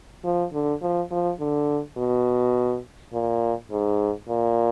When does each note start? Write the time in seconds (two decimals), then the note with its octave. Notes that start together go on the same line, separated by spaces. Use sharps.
0.24 F3
0.53 D3
0.82 F3
1.11 F3
1.40 D3
1.97 B2
3.13 A#2
3.71 G#2
4.29 A#2